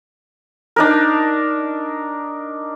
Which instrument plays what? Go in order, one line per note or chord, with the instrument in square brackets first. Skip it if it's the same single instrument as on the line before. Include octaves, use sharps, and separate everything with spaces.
[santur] D4 D#4 A#4